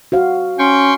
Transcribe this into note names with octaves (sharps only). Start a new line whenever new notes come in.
F#4 C5 F5
C#4 G5 C6 C#6